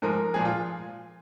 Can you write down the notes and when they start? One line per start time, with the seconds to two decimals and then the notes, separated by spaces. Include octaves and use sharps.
0.02 G#2 F3 G#3 A#4
0.34 A#2 F3 G#3 G#4
0.45 F4